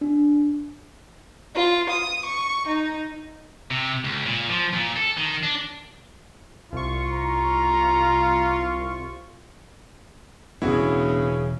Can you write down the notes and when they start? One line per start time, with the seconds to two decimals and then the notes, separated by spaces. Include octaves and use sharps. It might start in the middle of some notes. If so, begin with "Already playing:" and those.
0.01 D4
1.55 F4
1.90 D#6
2.26 C#6
2.68 D#4
3.71 C3
4.05 C#2
4.26 A#2
4.49 F3
4.73 A#2
4.97 A4
5.18 D#3
5.43 D4
6.73 C2 F4 C#6
7.13 A#5
10.62 E1 C#3 B3 C#4 D4 E4 F#4 G#4